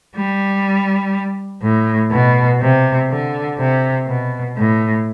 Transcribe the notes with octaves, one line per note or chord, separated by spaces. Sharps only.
G3
A2
B2
C3
D3
C3
B2
A2